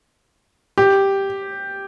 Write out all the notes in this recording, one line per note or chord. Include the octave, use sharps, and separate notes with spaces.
G4